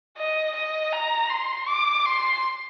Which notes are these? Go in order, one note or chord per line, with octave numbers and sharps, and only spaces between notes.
D#5
D#5
A#5
C6
D6
C6